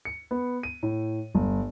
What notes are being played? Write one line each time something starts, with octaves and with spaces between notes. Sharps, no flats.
C#7
B3
D#7
A2
G1